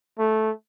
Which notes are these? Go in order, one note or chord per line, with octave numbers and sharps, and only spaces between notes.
A3